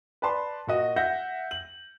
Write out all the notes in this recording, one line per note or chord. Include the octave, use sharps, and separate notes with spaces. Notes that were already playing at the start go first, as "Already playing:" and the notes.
B4 D5 A5 C6
A#2 F#4 D#5
E5 F#5 G6 A#6
F#7